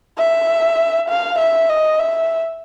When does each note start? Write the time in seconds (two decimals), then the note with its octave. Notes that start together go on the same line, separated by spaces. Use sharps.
0.18 E5
1.09 F5
1.39 E5
1.69 D#5
1.99 E5